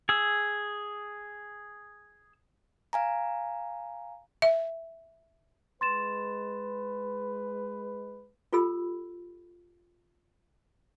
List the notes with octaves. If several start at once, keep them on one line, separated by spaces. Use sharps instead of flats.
G#4 E6
F5 G#5 A#5
E5
G#3 B4 C6 A6 E7
F4 G4 A4 B5 E6